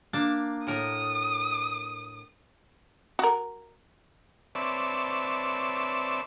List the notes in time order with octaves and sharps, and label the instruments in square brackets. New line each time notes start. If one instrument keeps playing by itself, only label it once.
[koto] A#3 D4 A5
[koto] A2 A#4 [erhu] D#6
[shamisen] F#4 A#4
[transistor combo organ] C4 B4 C#5 D5 E5 A5